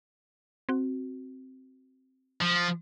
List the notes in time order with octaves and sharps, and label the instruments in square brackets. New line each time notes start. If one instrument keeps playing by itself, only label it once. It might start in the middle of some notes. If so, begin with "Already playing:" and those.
[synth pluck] C4 F#4
[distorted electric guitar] F3